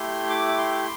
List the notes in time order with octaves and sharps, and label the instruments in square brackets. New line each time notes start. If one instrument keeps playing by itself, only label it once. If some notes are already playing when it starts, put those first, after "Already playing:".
Already playing: [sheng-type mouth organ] A3 E4 G4 C6
D6
D6
C6